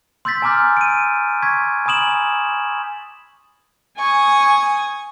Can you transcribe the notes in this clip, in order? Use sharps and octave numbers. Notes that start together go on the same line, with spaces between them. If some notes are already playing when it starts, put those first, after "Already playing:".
C6 E6 G6 A6 B6
G#5 A#5 C6 D6 F6 G6
D7 D#7
C#6 G#6 B6
G#5 A#5 B5 D#6 E7 F#7
G#5 C#6 D#6